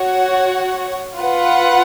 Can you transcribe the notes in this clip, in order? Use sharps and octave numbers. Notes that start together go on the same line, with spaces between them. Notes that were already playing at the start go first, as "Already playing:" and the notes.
Already playing: F#4 C#5 F#5
F4 B4 F#5